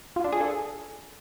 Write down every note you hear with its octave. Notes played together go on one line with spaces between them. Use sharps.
F4
D4
G#4
A4